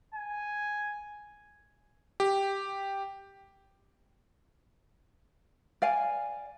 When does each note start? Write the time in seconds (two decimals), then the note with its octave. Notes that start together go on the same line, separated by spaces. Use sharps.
0.14 G#5
2.20 G4
5.82 D5 F5 G#5